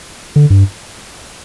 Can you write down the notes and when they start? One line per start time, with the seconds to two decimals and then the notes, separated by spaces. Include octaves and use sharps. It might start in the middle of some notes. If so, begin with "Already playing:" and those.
0.36 D3
0.50 G2